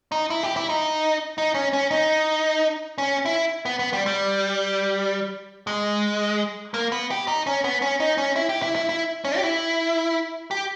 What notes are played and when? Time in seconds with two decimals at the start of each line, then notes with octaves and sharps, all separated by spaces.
0.12 D#4
0.30 E4
0.43 G4
0.56 E4
0.69 D#4
1.38 D#4
1.55 C#4
1.73 C#4
1.91 D#4
2.98 C#4
3.25 E4
3.66 B3
3.79 B3
3.93 G3
4.06 G3
5.67 G#3
6.74 A#3
6.92 B3
7.11 G4
7.28 D#4
7.47 C#4
7.64 B3
7.82 C#4
8.00 D#4
8.18 C#4
8.36 E4
8.49 G4
8.62 E4
8.76 E4
8.89 E4
9.25 C#4
9.37 G4
9.43 E4
10.51 G4